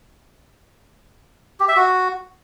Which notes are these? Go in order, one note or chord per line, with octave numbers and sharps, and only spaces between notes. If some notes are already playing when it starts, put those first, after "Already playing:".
G4
E5
F#4